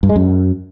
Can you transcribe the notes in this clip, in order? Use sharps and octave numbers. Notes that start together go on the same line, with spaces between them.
G2
G#3
F#2